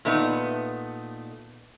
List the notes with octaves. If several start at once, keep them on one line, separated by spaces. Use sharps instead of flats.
A#2 A3 B3 D#4